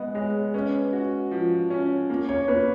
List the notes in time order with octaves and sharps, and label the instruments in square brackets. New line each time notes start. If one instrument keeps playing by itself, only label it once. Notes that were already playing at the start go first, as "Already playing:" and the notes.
Already playing: [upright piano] G#3 B3 [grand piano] D#5
[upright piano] G#3 [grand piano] C#5
[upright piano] C#4 [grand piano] B4
[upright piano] F#4
F3
C#4
A#3
[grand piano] C#5
[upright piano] A#3 [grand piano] B4